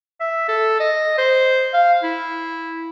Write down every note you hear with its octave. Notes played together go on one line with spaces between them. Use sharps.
E5
A4
D#5
C5
F5
E4